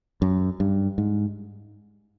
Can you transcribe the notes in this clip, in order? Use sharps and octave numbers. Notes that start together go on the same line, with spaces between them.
F#2
G2
G#2